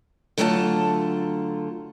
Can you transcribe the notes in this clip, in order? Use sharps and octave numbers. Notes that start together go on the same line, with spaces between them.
D3 F#3 A3 F4 D#5 A5